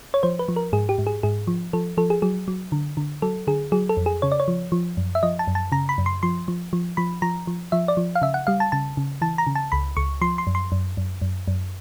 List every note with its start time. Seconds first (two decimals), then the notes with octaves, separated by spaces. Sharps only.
0.14 C#5
0.23 F3 C5
0.39 B4
0.48 F3
0.56 A#4
0.73 G#2 G#4
0.89 G4
0.98 G#2
1.07 G#4
1.23 G#2 G#4
1.47 F3
1.73 F3 A4
1.97 F3 A4
2.10 G#4
2.22 F#3 G#4
2.48 F#3
2.72 D3
2.97 D3
3.22 F#3 A4
3.47 D3 G#4
3.72 F#3 G#4
3.89 A4
3.97 F2
4.06 G#4
4.22 C#3 C#5
4.32 D5
4.40 C#5
4.48 F3
4.72 F3
4.97 F#2
5.15 E5
5.23 F3 D#5
5.39 A5
5.47 F#2
5.55 A5
5.72 C#3 A#5
5.89 B5
5.98 F#2
6.06 C6
6.23 F3 C6
6.48 F3
6.73 F3
6.97 F3 B5
7.22 F3 A#5
7.47 F3
7.72 F3 E5
7.88 D5
7.97 F3
8.15 F5
8.22 C#3 E5
8.34 F#5
8.47 G3 F5
8.60 A5
8.72 C#3 A5
8.97 C#3
9.22 E3 A5
9.38 A#5
9.47 C#3
9.55 A5
9.72 C#2 B5
9.97 C#2 C#6
10.21 F3 C6
10.38 C6
10.47 F#2
10.55 C6
10.72 F#2
10.97 F#2
11.22 F#2
11.48 F#2